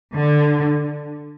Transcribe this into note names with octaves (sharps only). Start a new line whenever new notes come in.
D3